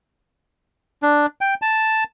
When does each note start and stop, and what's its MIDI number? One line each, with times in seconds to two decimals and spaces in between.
1.03 1.26 62
1.41 1.54 79
1.62 2.04 81